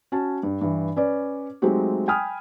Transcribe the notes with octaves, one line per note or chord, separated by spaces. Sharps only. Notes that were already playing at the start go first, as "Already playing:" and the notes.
C#4 F#4 A5
G2
G2 E3
C#4 B4 D5
F#3 G#3 A3 C4 D#4 G4
G5 G#5 B5 D#6 F6